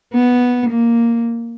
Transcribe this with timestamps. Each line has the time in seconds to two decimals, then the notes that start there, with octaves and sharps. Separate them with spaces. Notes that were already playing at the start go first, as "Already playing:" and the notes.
0.14 B3
0.70 A#3